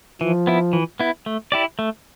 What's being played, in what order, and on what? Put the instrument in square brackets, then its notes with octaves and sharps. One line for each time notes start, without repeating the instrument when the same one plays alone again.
[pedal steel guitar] E3 [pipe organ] F3
[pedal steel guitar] B3 E4
E3
B3 E4
A3
E4 G4 D5
A3